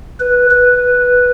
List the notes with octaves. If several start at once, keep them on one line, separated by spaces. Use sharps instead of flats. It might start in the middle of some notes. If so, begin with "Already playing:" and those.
B4
B4